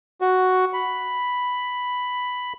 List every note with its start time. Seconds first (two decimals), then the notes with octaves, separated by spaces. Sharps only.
0.21 F#4
0.73 B5